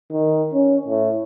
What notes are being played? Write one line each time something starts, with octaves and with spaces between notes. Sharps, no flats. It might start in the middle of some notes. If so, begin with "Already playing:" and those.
D#3
C#4
A2